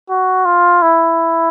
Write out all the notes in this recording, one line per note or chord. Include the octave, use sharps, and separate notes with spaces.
F#4
F4
E4